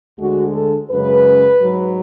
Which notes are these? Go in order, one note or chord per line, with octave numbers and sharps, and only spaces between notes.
D2 D3 G#3 F#4
A4
F#2 C#3 G#3 B4
G#2 F#3